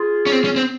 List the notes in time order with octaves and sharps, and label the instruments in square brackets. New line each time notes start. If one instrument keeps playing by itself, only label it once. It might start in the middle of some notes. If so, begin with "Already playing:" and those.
Already playing: [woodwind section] F4 G#4
[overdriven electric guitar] C#4
C4
C#4
C4